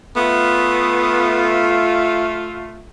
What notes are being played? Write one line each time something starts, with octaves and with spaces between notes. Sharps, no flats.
A3 B3 F4